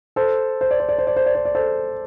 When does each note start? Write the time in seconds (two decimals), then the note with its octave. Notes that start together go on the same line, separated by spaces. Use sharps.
0.16 A4 C5
0.61 C5
0.71 D5
0.80 C5
0.89 D5
0.98 C5
1.07 D5
1.16 C5
1.26 D5
1.35 C5
1.45 D5
1.55 A4 C5